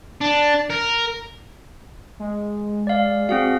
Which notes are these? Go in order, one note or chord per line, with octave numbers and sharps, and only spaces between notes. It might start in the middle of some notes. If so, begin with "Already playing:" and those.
D4
A#4
G#3
D5 F5
C4 F#4 G#4 F5